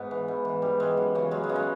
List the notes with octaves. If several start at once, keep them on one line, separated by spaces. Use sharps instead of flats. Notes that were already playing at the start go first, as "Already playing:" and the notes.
Already playing: G#2 B3
E3
G#2
E3
G#2 G3
E3 G#3
F#2
C#3 E3
F#2 G#3
G#3
C#3 E3
G#3